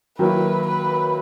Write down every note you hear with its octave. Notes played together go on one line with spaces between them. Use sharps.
D#3 F#3 A#3 E4 B4
B4